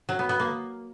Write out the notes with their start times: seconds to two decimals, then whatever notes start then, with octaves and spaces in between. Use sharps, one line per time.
0.09 F#3
0.19 B3
0.29 B3
0.40 A#3